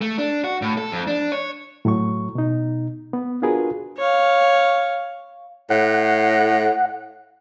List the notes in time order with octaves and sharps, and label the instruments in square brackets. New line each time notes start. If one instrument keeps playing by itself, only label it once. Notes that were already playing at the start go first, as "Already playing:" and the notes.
[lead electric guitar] A3
D4
F#4
A2
A4
F2
D4
C#5
[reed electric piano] A2 F#3 C#6
B2 D#4
B3
D4 F4 F#4 G#4 A#4 B4
[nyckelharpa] C#5 F5
[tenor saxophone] A2 [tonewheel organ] F#5